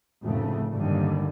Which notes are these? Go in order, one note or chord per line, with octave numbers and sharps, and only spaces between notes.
F1 A2 C#3 A3
G1 D#2 D3 G3